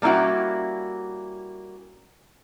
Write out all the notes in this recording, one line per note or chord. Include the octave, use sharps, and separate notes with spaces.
G3 A#3 C#4 E4 F#4